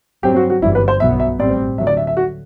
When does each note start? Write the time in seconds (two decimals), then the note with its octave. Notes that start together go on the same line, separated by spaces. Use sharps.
0.23 G2 F#3 C4 G4
0.36 F#4
0.50 F#4
0.62 G1 F#2 E3 G3 E4
0.75 B4
0.88 C5
1.00 B1 B2 F#3 B3 E5
1.20 E5
1.40 A1 A2 G3 C4 D5
1.78 D2 D3 F#3 E5
1.87 D5
1.97 E5
2.07 E5
2.17 F#4